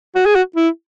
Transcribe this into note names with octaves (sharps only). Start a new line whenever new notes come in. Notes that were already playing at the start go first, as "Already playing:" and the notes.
F#4
G#4
F#4
E4